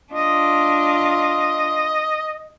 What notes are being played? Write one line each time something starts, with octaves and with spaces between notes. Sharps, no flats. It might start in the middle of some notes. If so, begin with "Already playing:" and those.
D4 F4 D#5